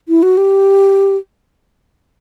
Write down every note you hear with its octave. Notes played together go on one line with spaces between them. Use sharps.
E4
F#4
G4